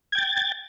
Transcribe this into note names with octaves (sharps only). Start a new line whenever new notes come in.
G5 G#6 A6